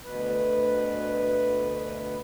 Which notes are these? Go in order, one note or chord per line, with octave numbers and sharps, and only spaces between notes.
D2 B2 B4